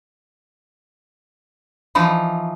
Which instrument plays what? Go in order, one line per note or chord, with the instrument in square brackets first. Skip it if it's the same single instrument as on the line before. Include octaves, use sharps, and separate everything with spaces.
[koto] E3 F3 D#4 [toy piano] B5